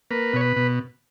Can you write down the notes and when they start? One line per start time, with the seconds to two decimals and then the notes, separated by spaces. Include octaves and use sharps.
0.11 A#3 B4
0.33 B2 C#5
0.41 B4
0.56 B2